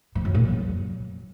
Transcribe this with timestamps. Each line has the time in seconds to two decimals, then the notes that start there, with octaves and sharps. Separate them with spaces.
0.15 F3
0.25 F#2
0.35 A#2
0.44 F#3